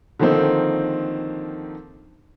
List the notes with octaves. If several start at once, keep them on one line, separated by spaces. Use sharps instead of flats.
D3 D#3 F3 A#3 C4 D#4